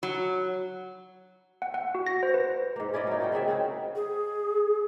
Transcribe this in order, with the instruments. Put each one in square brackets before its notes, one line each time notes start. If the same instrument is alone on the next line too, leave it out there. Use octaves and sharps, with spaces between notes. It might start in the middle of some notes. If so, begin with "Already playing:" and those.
[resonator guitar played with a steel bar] F#3
[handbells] F#5
F#5
F#4
A#6
C5
B4
[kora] G#2 A#3
C#4 E4 D5 D#5
F#3 D#4
F4 F#4 G5
C#3 C4 G#4 E5
C4 D#4 F#4 G#4
[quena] G#4